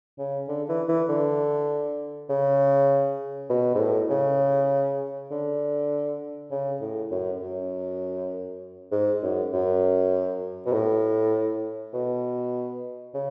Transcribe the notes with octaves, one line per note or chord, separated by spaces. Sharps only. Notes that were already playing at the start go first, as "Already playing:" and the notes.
C#3
D3
E3
E3
D3
C#3
B2
G#2
A2
C#3
D3
C#3
A2
F#2
F#2
G#2
F#2
F#2
B2
A2
B2
C#3